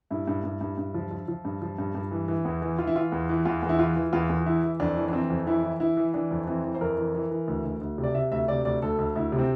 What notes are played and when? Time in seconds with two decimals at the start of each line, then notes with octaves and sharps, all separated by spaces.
0.11 G2 E4
0.28 G2
0.44 G2
0.61 G2
0.78 G2
0.94 F3
1.11 F3
1.28 F3
1.45 G2
1.62 F3
1.79 G2
1.95 G2
2.11 E3
2.28 E3
2.45 E2
2.62 E3
2.78 E3 F4
2.87 E4
2.95 E3 F4
3.12 E2
3.29 E3
3.45 E2 F4
3.63 E2
3.69 E4
3.79 E3 F4
3.96 E3
4.13 E2 F4
4.29 E2
4.46 E3 E4
4.63 E3
4.80 F2 D4
4.97 E3
5.08 D4
5.13 E3 C4
5.30 F2
5.47 E3 E4
5.63 E3
5.80 E3 E4
5.97 E3
6.14 E3 D4
6.31 F2
6.47 E3 C4
6.64 E3
6.75 C5
6.81 F2 A#4
6.98 E3
7.15 E3
7.31 E3
7.48 D2
7.65 D2
7.81 D2
7.98 C3
8.03 D5
8.15 C3 E5
8.32 D2 E5
8.48 C3 D5
8.65 D2 D5
8.82 D2 A4
8.99 D2
9.15 D2 E4
9.32 C3
9.39 C4